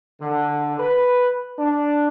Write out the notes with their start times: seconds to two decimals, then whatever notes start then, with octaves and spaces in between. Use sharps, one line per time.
0.20 D3
0.79 B4
1.58 D4